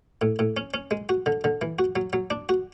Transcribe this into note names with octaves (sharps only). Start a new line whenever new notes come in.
A2
A2
C#4
C#4
G#3
F#4
D3
D3
E3
F#4
F#3
F#3
D4
F#4